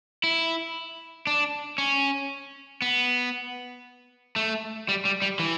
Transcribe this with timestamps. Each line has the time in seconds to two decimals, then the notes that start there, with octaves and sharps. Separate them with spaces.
0.23 E4
1.27 D4
1.78 C#4
2.82 B3
4.36 A3
4.89 G3
5.05 G3
5.22 G3
5.39 E3